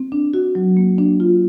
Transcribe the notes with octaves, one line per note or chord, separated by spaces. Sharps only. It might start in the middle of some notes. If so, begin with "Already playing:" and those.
Already playing: C4
D4
F#4
F#3
A#3
D4
F4